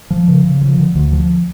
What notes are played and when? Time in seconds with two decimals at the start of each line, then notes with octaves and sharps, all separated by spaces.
0.10 F3
0.28 C#3
0.44 C#3
0.61 F3
0.78 D3
0.95 D2
1.12 F3